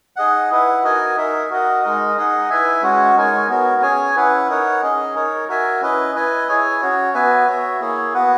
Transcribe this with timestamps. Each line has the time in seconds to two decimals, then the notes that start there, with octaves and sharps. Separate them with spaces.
0.16 D#4 G#4 D#5 F#5
0.51 E4 B4 F#5
0.83 D#4 F#4 A#4 D#5 G#5
1.17 D#4 A#4 E5
1.50 F#4 A#4 D#5 F#5
1.83 G#3 D#4 A#4 D#5
2.16 D#4 G#4 D#5 F#5
2.50 E4 B4 E5 G#5
2.82 G#3 C#4 F#4 C#5 F#5
3.15 G#3 D#4 A#4 C#5 G#5
3.49 B3 F#4 A#4 C#5
3.82 C#4 G#4 C#5 G#5
4.15 C#4 E4 B4 F#5
4.49 D#4 A#4 C#5 F#5
4.82 C#4 G#4 D#5
5.14 D#4 A#4 C#5
5.49 F#4 A#4 E5 G#5
5.81 C#4 E4 B4 D#5
6.15 E4 B4 D#5 G#5
6.48 E4 G#4 C#5 G#5
6.81 C#4 F#4 C#5
7.14 B3 F#4 B4 E5 G#5
7.47 F#4 C#5 E5
7.80 A#3 E4 G#4 C#5
8.14 B3 F#4 B4 F#5